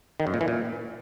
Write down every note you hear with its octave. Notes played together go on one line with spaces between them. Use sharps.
D#3
F#2
A#2
E3
A#2